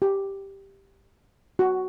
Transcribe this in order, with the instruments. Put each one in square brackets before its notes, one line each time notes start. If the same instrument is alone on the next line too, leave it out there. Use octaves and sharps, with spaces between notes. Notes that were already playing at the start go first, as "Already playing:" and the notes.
[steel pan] G4
F#4